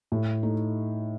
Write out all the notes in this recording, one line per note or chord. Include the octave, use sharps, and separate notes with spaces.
A2
A3 D#4